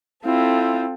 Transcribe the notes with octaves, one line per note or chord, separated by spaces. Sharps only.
C4 E4 F4 A4